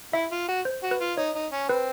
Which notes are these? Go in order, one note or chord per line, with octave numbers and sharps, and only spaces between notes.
E4 E5
F4
F#4
C5
F#4
B4
F4
D#4 C#5
D#4
C#4
C4 B4